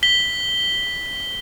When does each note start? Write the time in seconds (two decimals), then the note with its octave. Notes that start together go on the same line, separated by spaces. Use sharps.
0.03 B6 G7